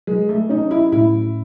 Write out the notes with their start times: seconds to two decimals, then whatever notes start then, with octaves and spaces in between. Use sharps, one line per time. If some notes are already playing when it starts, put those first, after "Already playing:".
0.07 F#3 G#3
0.29 A3
0.50 C#4 D#4
0.71 E4
0.92 A2 E4